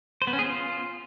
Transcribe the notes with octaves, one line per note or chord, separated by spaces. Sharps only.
C5
B3
C#4
G#4
F4